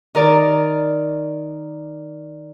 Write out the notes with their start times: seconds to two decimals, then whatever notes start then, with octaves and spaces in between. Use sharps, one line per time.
0.15 D#3 A#4 D5